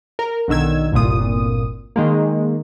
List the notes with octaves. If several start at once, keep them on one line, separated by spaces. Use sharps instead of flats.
A#4
B1 D3 D#3 E6 G#6
G1 C2 A#2 D#6
D#3 G#3 A#3